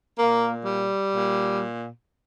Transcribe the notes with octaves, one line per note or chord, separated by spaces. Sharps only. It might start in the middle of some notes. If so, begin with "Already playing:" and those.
A#2 A#3
G3
A#2